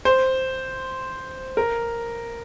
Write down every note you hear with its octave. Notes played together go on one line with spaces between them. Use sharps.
C5
A#4